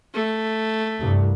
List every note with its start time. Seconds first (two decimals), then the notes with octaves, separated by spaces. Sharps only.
0.14 A3
0.98 C2 G2